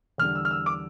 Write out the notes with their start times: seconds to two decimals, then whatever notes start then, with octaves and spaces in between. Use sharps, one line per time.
0.18 E2 D3 G3 F6
0.35 E6
0.45 F6
0.51 E6
0.66 D6